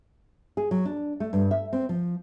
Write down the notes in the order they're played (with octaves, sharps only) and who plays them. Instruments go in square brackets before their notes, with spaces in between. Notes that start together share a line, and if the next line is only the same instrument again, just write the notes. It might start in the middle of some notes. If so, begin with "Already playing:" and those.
[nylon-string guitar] G#4
F#3
D4
A3
G2
E5
C4
F3